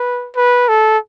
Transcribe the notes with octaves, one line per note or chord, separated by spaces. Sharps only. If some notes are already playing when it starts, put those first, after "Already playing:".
Already playing: B4
B4
A4